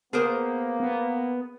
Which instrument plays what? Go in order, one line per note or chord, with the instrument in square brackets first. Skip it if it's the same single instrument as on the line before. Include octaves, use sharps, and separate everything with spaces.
[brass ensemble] A#3 [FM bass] B3 [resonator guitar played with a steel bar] G#4 A#4 C5
[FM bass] B3